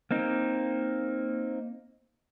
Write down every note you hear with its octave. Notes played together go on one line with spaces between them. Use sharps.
A#3 C4 D#4